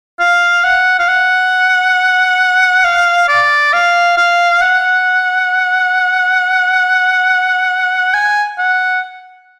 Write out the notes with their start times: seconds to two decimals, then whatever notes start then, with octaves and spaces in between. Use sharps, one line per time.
0.20 F5
0.64 F#5
0.99 F5
1.08 F#5
2.84 F5
3.29 D5
3.73 F5
4.17 F5
4.61 F#5
8.14 G#5
8.58 F#5